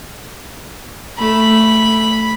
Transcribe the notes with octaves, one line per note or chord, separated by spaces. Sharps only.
A3 B5